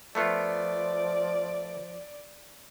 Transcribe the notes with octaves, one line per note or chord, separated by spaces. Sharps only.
F3 A3 B3 F4 D5